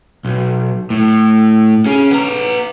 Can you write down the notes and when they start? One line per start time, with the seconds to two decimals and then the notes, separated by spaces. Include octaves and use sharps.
0.25 B1
0.90 A2
1.86 C#4 G#4
2.11 B3 A#5